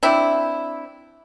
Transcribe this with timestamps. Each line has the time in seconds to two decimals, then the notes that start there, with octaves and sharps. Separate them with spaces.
0.03 C4 D4 E4